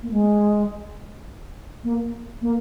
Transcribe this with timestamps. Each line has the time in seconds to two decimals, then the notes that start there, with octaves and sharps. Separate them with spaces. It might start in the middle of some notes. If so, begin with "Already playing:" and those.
0.03 A#3
0.12 G#3
1.84 A#3
2.42 A#3